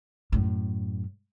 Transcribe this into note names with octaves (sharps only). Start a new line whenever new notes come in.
F#2 A2